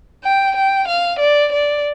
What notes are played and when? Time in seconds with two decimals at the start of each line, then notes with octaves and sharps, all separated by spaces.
0.24 G5
0.56 G5
0.88 F5
1.19 D5
1.52 D5